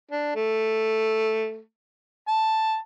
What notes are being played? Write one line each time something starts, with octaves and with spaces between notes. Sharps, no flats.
D4
A3
A5